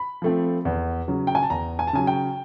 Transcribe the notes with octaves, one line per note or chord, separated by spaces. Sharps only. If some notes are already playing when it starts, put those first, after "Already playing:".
Already playing: B5
F3 A3 C4
E2
C#3 F#3
G5
G#5
A5
E2 A#5
G#5
A5
C#3 F#3 G#5
G5